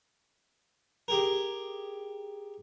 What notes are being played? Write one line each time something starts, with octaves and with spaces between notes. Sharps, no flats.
G4 G#4 A#4